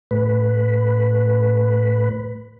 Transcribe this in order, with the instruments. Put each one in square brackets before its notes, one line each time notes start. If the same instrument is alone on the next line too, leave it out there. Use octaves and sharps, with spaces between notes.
[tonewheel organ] A2 B4